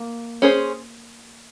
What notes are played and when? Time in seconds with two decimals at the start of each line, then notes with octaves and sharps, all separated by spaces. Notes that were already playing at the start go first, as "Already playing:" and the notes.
Already playing: A#3
0.42 C#4 G#4 C5